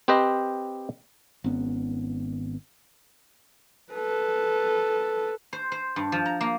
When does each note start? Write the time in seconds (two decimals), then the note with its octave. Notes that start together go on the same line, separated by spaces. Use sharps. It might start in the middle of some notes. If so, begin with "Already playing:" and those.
0.08 C4 G4 B4 C5 D#5
1.44 G#1 B3 C#4
3.93 A4 B4
5.53 C5
5.72 C5
5.96 G2
6.12 F3
6.26 A#5
6.41 A#3